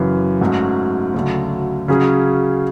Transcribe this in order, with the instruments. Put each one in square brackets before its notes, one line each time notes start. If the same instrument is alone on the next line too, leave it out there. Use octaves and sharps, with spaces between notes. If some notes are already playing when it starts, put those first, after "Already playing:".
Already playing: [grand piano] F#2 C#3 E3
G#2 F#3 A3 C#4
D2 C#3 F#3 A3
C#3 F#3 C#4 G#4